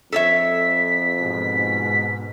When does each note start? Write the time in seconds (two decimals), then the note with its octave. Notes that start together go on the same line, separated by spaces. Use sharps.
0.12 F2 A4 C#5 E5 B6
1.17 G#2 B2